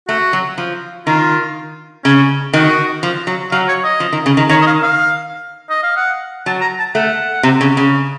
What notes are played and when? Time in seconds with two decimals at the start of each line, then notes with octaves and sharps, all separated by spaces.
0.08 A3 F#4
0.33 F#3
0.58 F3
1.07 D#3 F4
2.05 C#3 C#4
2.54 D#3 F#4
3.03 F3
3.27 F#3
3.52 F#3 F5
3.68 C#5
3.84 D#5
4.00 F3
4.13 D#3
4.26 C#3
4.37 D#3
4.49 D#3 C#5
4.62 D#5
4.67 F5
4.83 F5
5.70 D#5
5.83 F5
5.97 F#5
6.46 F#3 A5
6.62 A#5
6.79 A5
6.95 A3 F#5
7.43 C3
7.61 C#3
7.77 C#3